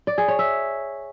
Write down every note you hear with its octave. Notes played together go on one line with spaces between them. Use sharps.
D5
G#4
C#5
E5